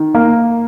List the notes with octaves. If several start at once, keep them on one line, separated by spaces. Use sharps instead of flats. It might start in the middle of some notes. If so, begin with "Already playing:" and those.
Already playing: D#3
A#3